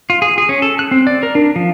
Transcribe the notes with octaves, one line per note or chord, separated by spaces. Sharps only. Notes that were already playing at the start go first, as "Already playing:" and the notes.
F4
G#4
G#4
C#4
A4
F#6
C4
D5
A#4
D4
F3